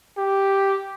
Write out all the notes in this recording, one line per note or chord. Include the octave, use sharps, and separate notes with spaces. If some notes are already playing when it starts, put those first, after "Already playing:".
G4